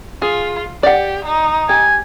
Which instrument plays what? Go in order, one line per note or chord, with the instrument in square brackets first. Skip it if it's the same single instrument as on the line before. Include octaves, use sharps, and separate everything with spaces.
[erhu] F4 [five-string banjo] G#4
[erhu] G4 [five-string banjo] D5 F#5
[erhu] D#4
[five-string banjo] G4 [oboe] G#5